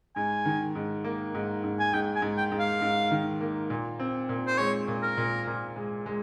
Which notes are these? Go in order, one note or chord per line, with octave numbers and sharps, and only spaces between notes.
G#2 G#5
D#3
G#2
A#3
G#2
G#2
G#5
G#2 G5
G#5
G#2
G5
G#2
F5
G#2
D#3
A#3
A#2
C4
A#2
C5
G#3 C#5
A#2
A#4
A#2
A#2
G#3
G#3